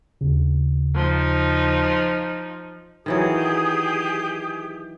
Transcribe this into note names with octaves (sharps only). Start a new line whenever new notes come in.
D#2 C#3
F3 D#4
D#3 E3 F#3 G4 G#4 D#6